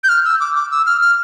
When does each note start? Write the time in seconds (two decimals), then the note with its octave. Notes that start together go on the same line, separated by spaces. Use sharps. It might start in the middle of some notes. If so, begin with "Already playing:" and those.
0.04 G6
0.09 F6
0.25 E6
0.40 D6
0.55 D6
0.71 E6
0.86 F6
1.01 F6